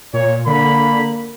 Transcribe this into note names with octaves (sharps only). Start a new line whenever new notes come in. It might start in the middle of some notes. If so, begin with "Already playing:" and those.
A#2 C#5
D3 A#3 B5